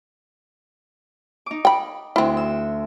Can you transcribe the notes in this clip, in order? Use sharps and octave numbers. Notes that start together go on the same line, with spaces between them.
D#4 D6
G5 B5
D2 C4 E4 C6
E6